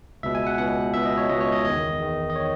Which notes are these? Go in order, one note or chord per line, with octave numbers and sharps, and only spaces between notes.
C#2 B2 E5
G#5
F#5
C#2 B2 F#5
C#2 B2 E5
D#5
C#5
C#2 B2 D#5
C#5
D#5
E2 D#3 D#5
E2 D#3
D#5
D#3 C#5